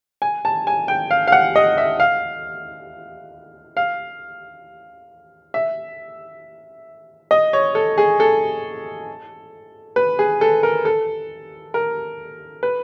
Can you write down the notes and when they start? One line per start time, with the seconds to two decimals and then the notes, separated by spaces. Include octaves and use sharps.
0.22 G#5
0.45 A5
0.67 G#5
0.88 G5
1.11 F5
1.27 F5
1.32 F#5
1.56 D#5
1.78 E5
2.00 F5
3.77 F5
5.54 E5
7.31 D#5
7.53 C#5
7.75 A4
7.98 G#4
8.20 A4
9.96 B4
10.19 G#4
10.41 A4
10.63 A#4
10.85 A4
11.74 A#4
12.63 B4